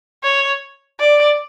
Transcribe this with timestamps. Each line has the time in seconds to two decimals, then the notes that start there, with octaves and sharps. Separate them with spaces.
0.24 C#5
1.00 D5